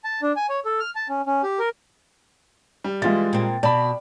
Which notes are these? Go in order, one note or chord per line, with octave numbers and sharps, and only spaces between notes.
A5
D4
G#5
C#5
A4
F6
A5
C#4
C#4
G4
A#4
G3
E3 G#3 F4 A6
A#2 C4
B2 D5 A5 B5